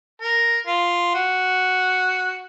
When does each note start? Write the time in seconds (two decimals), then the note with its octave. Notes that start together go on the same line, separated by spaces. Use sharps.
0.21 A#4
0.67 F4
1.14 F#4